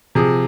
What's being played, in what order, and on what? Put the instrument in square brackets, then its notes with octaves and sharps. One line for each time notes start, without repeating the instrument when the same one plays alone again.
[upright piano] C3 F3 G#4